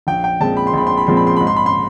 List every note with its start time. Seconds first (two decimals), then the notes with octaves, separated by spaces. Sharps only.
0.07 A#1 G5
0.24 G5
0.40 A#2 F3 G#3 C4 A5
0.57 B5
0.67 C6
0.73 A#1 B5
0.87 C6
0.97 B5
1.07 A#2 F3 G#3 C4 C6
1.17 B5
1.27 C6
1.36 G#2 B5
1.47 C6
1.56 B5
1.66 C6